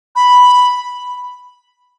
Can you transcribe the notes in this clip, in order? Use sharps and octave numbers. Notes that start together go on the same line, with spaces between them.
B5